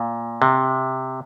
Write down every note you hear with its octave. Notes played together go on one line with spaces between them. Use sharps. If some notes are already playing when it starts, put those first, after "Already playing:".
Already playing: A#2
C3